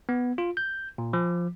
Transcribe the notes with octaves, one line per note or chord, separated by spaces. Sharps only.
B3
F4
G6
A#2
F3